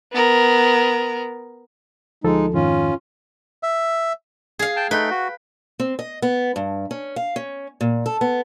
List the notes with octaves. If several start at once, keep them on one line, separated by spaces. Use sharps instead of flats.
B3 A#4
D2 F3 G#3 D#4 A4
F2 G#2 D#3 C#4 F4
E5
G#4 F5
G5 A5
A3 D#4 B4 G5
F#4
C4
D#5
B3
G2
C#4
F5
C#4
A#2
A4
B3